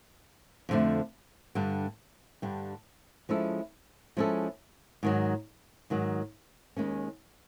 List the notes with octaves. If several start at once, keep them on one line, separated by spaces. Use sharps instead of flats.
F2 D3 F3 A3
G2 D3 G3
G2 D3 G3
F3 G#3 C#4 E4 A4
F3 G#3 C#4 E4 A4
G#2 D#3 F#3
G#2 D#3 F#3
D#2 D#3 G#3 C#4